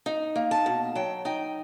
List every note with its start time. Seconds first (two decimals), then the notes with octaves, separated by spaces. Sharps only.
0.06 D#4
0.36 A#3
0.51 A5
0.66 B2
0.95 F#3 G5
1.25 D#4 G5